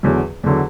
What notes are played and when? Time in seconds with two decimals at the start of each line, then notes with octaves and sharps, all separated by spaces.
0.03 E2 D3 F#3
0.44 E2 D3 F#3